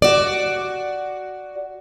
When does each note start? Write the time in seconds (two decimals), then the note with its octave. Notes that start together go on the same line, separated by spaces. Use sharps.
0.02 F#4 D5